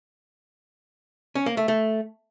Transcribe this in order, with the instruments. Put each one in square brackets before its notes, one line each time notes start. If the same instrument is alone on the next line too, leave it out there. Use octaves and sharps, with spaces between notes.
[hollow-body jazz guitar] C#4
A#3
A3
A3